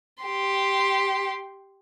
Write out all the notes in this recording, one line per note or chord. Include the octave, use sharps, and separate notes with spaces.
G4 C6